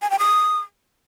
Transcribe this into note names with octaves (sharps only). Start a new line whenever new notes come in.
G#5
G5
D#6